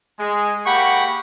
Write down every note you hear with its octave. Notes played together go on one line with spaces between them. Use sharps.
G#3
A#3 G4 F#5 B5 C#6